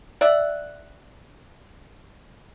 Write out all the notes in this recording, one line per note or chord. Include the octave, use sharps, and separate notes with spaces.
D5 E5 F#5